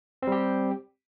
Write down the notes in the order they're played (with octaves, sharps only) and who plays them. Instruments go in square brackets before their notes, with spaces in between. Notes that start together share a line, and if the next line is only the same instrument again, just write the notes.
[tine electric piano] C4
G3
G4